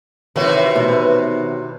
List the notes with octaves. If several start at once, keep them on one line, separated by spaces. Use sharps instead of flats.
C3 D#3 E3 F#4 C#5
B2